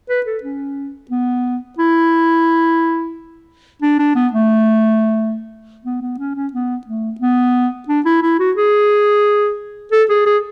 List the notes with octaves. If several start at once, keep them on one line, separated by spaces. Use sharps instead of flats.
B4
A4
C#4
B3
E4
D4
D4
B3
A3
B3
B3
C#4
C#4
B3
A3
B3
D4
E4
E4
F#4
G#4
A4
G#4
G#4